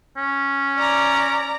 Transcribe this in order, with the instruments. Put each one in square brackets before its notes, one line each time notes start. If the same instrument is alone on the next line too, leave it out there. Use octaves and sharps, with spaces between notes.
[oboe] C#4
[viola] D5 A#5